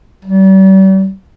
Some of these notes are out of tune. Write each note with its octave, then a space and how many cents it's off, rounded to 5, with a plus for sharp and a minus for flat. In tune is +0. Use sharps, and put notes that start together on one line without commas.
G3 -40